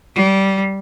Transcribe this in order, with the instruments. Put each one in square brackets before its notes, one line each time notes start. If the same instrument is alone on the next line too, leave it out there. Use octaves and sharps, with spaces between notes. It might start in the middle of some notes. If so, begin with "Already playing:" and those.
[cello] G3